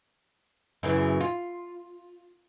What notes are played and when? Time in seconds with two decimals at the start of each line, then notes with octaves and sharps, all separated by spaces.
0.83 F#2 C#3 E3
1.20 F4